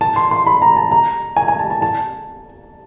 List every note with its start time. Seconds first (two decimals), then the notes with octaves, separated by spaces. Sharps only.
0.01 A5
0.16 C6
0.31 C6
0.46 B5
0.62 A#5
0.77 A5
0.91 A#5
1.36 G#5
1.48 G#5
1.59 A5
1.70 A5
1.82 A5